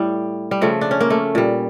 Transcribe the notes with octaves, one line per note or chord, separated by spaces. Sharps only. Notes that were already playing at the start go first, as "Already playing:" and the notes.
Already playing: A2 G3
G3
C#3 F3 A3
D4
C#4
A#3
A3
A#2 G3